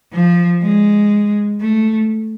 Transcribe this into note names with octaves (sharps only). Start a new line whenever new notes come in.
F3
G#3
A3